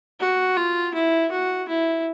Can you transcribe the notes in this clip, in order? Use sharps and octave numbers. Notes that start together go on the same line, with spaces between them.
F#4
F4
E4
F#4
E4